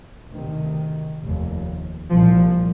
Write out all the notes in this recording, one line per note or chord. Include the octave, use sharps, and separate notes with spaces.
D2 C3 D#3
F1 D#2
C2 A#2 F3